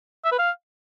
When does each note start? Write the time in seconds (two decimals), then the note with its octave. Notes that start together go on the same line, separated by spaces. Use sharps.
0.25 E5
0.32 B4
0.39 F5